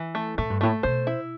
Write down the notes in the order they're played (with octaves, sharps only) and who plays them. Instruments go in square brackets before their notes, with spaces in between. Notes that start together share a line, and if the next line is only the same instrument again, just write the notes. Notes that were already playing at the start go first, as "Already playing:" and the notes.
Already playing: [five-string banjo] E3
A3
[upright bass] A2 [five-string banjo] A3
[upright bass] G2
[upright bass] A2 [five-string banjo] A3
[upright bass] B2 [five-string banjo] C5
[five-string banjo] E4